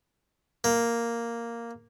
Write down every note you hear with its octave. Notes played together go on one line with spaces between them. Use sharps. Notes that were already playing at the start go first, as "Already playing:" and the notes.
A#3